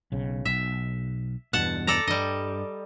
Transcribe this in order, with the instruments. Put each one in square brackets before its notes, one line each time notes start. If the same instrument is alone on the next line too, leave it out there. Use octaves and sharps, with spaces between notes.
[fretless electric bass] B1 C#3
[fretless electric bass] B1 [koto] E5
[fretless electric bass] E2 G2 B2 [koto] F#5 A5
[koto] A4 D5 A#5
[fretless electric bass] G2 [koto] G3 D#5